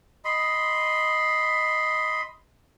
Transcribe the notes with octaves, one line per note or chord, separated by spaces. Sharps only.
D#5 B5 C6